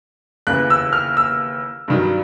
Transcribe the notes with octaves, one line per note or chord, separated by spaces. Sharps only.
D#2 C#3 E3 F#6
E6
F6
E6
G2 D#3 F#3